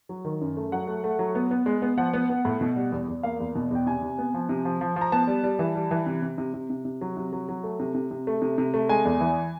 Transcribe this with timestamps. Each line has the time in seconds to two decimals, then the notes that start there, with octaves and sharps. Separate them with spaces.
0.09 F#3
0.25 D#3
0.41 F#2
0.57 A3
0.72 F#3 F#5
0.87 A3
1.04 A3
1.19 F#3
1.35 B3
1.51 B3
1.66 G#3
1.82 B3
1.98 F3 F#5
2.13 B3
2.30 B3
2.45 A2
2.61 B2
2.76 G3
2.92 E2
3.08 E2
3.23 A#3 F5
3.40 E2
3.55 B2
3.71 E2 G5
3.86 C3 G#5
4.02 C3
4.18 B3
4.34 F3
4.49 C3
4.65 F3
4.81 F3
4.96 F3
5.01 A#5
5.12 B3 A5
5.27 G3
5.43 G3
5.59 E3
5.75 G3
5.91 E3
6.06 C3
6.22 C3
6.38 C3
6.54 C3
6.70 C3
6.85 C3
7.01 F#3
7.17 C3
7.33 F#3
7.49 F#3
7.64 A3
7.80 C3
7.95 C3
8.11 C3
8.27 A3
8.42 C3
8.58 C3
8.74 A3
8.89 G#3 G#5
9.05 E2
9.20 E3